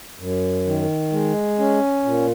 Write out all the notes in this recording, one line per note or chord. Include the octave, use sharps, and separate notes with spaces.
F#2
D#3
G#3
C#4
A#2